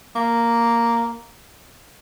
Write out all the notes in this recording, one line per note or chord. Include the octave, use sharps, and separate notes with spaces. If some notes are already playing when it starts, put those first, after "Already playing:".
A#3